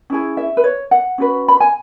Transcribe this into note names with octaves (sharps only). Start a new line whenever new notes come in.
C#4 E4 G#4
E5
B4
C#5
F#5
C#4 F#4 B4
B5
G#5